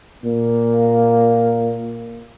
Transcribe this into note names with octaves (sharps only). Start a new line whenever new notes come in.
A#2 A#3